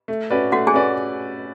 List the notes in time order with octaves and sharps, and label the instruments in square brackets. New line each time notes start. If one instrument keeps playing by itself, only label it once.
[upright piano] A3
C#4 F#4 B4 D5
[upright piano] A3 [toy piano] F#4 F#5
[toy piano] G#4 G#5
[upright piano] C#4 F#4 B4 D5